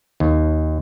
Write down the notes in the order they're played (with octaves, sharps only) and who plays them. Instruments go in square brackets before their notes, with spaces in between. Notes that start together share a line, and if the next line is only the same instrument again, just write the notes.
[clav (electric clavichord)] D#2